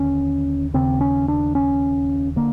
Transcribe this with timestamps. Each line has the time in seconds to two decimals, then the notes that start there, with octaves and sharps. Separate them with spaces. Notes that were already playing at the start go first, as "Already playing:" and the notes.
Already playing: D#2 D3 C#4
0.74 D#2 C#3 C4
1.01 C#4
1.28 D4
1.55 C#4
2.36 D3 A#3